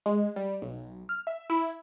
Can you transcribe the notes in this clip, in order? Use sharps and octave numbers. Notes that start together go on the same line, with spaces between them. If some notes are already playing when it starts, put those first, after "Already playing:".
G#3
G3
B1
F6
E5
E4